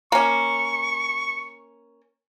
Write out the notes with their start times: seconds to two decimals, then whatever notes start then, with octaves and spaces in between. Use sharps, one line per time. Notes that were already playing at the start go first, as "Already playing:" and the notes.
0.12 A#3 C#4 C#6